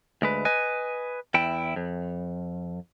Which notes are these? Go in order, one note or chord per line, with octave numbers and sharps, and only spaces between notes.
D2 G#3 B4
B4 D#5 G#5
E2 E4 G5
F2